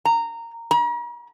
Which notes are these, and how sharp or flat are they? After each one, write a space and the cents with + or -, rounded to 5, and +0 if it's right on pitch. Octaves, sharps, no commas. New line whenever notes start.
A#5 -15
A#5 +45